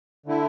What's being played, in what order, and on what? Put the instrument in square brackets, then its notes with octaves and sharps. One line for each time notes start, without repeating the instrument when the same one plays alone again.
[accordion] D3 A3 E4